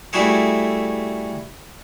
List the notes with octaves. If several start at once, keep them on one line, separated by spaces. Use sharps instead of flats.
G3 A3 E4 F#4 G#4 A4